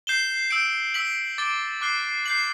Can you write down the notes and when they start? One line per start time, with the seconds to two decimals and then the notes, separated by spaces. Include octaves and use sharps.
0.07 G6 C7 E7 G7
0.51 E6 G6 D7
0.94 E6 B6 F#7
1.38 D6 A6 D7 G7
1.81 D6 F#6 C7 G7
2.26 G6 C7 F#7